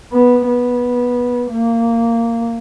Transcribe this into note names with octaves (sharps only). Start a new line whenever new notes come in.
B3
B3
A#3